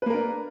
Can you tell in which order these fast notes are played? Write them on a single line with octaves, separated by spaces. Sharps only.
B4 A#3 A#4 D4